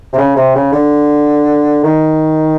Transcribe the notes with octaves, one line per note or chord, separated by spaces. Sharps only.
C3
C#3
C3
C#3
D3
D#3